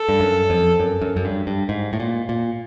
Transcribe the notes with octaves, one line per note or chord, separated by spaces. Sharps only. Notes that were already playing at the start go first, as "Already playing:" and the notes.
Already playing: A4
G2
F#2
F2
F#2
F#2
F#2
G2
G2
G#2
A2
A#2
A#2